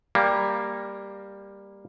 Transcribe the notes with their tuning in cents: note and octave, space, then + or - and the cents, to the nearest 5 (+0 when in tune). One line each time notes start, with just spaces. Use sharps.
G3 +10 A#3 +0